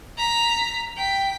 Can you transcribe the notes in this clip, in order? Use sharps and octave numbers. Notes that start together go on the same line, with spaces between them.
A#5 B6
G5 B6